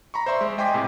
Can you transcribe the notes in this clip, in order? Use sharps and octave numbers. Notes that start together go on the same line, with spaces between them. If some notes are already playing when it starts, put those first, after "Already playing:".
A#5 B5 C#6
C5 D5 E5 C6
G#3
D#5 G5 G#5 C6 D6 B6
A2 C3